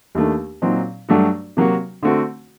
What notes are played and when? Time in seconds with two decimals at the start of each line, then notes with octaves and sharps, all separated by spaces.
0.15 D#2 D#3 A3 D4
0.62 A#2 F#3 C4 D#4
1.09 G2 F#3 A3 D4 F#4
1.57 C3 F#3 A#3 F#4
2.03 D3 A3 C4 F#4